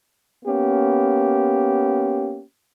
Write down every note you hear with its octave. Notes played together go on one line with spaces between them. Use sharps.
A#3 B3 C#4 G4